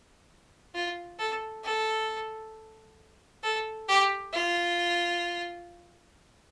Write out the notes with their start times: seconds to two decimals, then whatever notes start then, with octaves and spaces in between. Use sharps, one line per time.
0.74 F4
1.19 A4
1.64 A4
3.43 A4
3.89 G4
4.34 F4